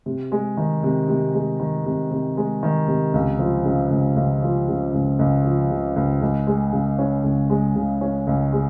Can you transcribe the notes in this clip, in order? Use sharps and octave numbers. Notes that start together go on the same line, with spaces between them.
C3
G#3
D#3
C3
C3
G#3
D#3
C3
C3
G#3
D#3
C3
C#2
F3
C#3
C#2
C#2
F3
C#3
C#2
C#2
F3
C#3
C#2
C#2
G#3
C#3
C#4
C#2
G#3
C#3
C#4
C#2
G#3